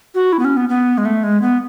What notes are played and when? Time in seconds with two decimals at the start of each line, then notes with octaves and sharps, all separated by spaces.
0.15 F#4
0.33 E4
0.39 B3
0.45 C#4
0.57 B3
0.69 B3
0.98 G#3
1.05 A3
1.24 G#3
1.42 B3